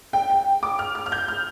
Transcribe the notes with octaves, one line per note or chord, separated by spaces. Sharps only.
G5
G5
D6
F6
F6
F6
G6
F6